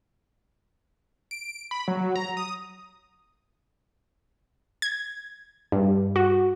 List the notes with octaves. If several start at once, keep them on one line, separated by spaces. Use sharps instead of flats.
D7
B5
F#3
A#5
D#6
G#6
G2
F#4